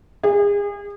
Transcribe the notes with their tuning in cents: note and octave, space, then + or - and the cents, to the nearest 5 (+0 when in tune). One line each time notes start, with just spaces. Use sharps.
G#4 -35